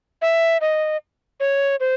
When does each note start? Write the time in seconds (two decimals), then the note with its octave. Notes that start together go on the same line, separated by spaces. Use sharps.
0.22 E5
0.61 D#5
1.40 C#5
1.80 C5